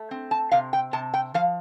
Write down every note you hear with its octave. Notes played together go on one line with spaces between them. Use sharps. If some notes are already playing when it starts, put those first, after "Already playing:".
Already playing: A3
C4
A5
C3 F5
G5
C3 A5
G5
F3 F5